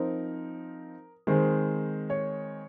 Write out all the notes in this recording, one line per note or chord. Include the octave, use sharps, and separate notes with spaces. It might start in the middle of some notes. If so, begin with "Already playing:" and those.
Already playing: F3 C4 D#4 A#4
D#3 G#3 C4 C5
C#5